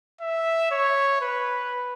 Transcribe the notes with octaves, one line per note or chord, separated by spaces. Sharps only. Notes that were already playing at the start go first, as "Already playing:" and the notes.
E5
C#5
B4